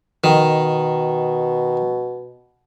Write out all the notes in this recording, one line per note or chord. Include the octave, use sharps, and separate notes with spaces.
B2 D#3